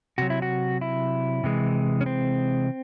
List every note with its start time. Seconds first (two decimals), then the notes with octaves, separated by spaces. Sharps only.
0.18 C3 F#3 F#4
0.30 E4
0.42 F#4
0.81 E4
1.44 C3 E3 G#3
2.01 C#4
2.06 C4